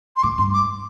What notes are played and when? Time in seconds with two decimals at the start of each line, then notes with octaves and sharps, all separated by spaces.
0.16 C6
0.23 A2 D6
0.38 G2 C6
0.53 D6